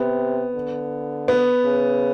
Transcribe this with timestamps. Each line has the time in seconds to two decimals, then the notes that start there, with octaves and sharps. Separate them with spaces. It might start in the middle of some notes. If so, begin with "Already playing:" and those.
Already playing: C3 B3
0.55 D3
1.28 B3
1.64 C#3